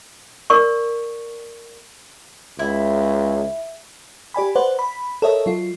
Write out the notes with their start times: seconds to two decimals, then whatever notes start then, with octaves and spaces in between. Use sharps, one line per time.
0.50 A#4 D5 C#6
2.59 C#2 E4
4.34 G4 D5 G#5 B5
4.56 B4 C5 D5 F#5
4.79 B5
5.22 A4 A#4 C#5 D#5 E5
5.46 F#3 F4